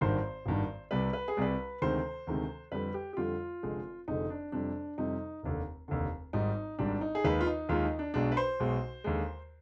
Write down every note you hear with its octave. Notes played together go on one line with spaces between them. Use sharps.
G#1 G2 D#3 C5
G#1 G2 D#3
C2 C3 G3 B4
B4
G#4
C2 C3 G3 B4
D2 C3 D#3 G#3 C5
D2 C3 D#3 G#3
F2 D3 G3 B4
G4
G4
F2 D3 G3 F4
F1 F2 D3 G#3
F1 F2 D3 G#3 D#4
D4
F2 C3 G3 D4
F2 C3 G3 D#4
F1 D#2 D3
F1 D#2 D3
G#1 G#2 G3 D#4
G#1 G#2 G3 D4
D#4
G#4
D#2 D#3 G#3 B4
F4
D#4
D#2 D#3 G#3 F4
D#4
D4
B1 B2 G#3 D4
B4
C5
B1 B2 G#3
D#2 D3 G#3